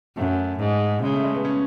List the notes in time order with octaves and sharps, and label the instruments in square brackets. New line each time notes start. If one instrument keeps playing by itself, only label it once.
[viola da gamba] F#2 [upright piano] A3
[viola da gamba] G#2
[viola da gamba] C#3 [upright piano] G#3
[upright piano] A3
G#3
B3
C#4